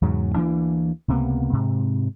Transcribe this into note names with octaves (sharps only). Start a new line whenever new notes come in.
E2 G#2 C#3 F#3
D2 E3 A#3 D4
C#2 C3 A#3 B3
G#2 C3